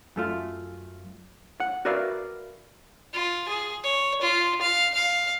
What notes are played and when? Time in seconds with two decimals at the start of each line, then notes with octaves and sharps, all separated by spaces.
0.16 F#2 A3 F4
1.60 F#5
1.85 F#4 A#4 B4 D5 E5 F5
3.14 F4
3.49 G#4
3.84 C#5
4.22 F4
4.62 F5
4.95 F5